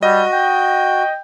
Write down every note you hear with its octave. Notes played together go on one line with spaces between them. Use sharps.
G3 F#4 D#5
G5